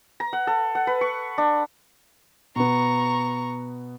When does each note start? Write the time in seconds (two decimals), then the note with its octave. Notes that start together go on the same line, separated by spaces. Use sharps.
0.20 A#5
0.33 F#5
0.47 A4
0.75 F#5
0.87 B4
1.01 C#6
1.38 D4
2.56 B2 B3 A#5 C#6